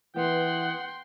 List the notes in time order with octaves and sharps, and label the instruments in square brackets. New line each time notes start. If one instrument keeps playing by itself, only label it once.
[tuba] E3 [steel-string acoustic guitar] B3 [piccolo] F#5 [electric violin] G5 C6